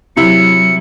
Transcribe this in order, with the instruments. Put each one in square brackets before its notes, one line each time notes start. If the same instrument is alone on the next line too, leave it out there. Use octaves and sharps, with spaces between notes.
[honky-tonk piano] C3 E4 [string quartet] F#3 [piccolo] C#7